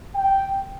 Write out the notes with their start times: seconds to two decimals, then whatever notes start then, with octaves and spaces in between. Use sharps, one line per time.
0.15 G5